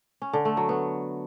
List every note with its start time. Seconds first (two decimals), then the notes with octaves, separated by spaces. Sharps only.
0.22 C#4
0.33 D3
0.45 A3
0.57 F#3
0.69 B3